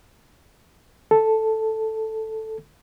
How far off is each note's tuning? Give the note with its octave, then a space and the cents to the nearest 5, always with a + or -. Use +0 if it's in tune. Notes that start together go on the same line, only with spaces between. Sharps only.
A4 +0